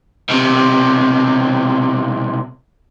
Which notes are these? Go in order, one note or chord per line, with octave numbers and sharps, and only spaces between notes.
B1 C3